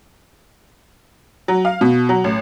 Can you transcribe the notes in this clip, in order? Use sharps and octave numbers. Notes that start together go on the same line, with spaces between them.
F#3
F5
B2
F#3
A1